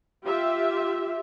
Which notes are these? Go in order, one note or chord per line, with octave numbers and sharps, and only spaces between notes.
F4 G4 E5